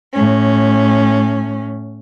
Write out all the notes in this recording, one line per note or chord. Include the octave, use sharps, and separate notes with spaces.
A2 C#4